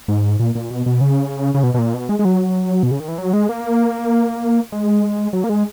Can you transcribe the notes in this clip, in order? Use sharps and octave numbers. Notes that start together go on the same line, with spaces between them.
G#2
A#2
A#2
B2
B2
C#3
C#3
B2
B2
A#2
B2
G#3
G#3
F#3
B2
C#3
D#3
E3
F#3
G#3
A#3
G#3
F#3
A#3
G#3